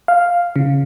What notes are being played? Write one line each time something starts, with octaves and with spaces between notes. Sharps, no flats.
F5
C#3